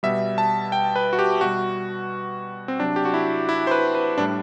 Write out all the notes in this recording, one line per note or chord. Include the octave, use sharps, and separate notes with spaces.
B2 G3 E5
A5
G5
B4
F#4
G4
B2 G3 F#4
C4
C3 F#3 D4
G4
F#4
E4
E4
C5
B4
B4
A2 G3 D4